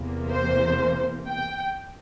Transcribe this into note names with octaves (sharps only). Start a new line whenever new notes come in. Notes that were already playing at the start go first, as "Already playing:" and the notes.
Already playing: E2 C3 E3 A#3
C5
G5